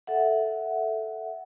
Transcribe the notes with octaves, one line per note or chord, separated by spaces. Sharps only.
A4 E5 F#5